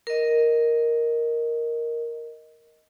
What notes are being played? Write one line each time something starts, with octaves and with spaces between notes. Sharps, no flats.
A#4 D#5